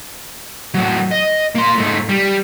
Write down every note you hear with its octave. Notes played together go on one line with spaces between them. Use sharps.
A2 F#3
D#5
A#3 C6
G#2 A3
G3